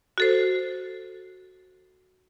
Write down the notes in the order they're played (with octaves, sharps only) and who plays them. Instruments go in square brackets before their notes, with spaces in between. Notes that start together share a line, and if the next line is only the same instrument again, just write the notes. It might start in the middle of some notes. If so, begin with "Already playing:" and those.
[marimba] F#4 A4 C5